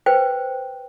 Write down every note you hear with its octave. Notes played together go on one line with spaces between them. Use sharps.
B4 C5 G5